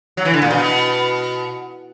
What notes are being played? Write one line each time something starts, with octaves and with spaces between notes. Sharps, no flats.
F#3
E3
D3
A#2
B2